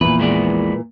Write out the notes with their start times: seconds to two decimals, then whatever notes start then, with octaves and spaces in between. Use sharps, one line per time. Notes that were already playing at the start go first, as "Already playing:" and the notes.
0.01 A#1 E2 A#2 E3 B4
0.20 G#3 B3 D5